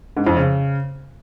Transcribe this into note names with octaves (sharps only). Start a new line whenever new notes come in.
G#2
F2
C#3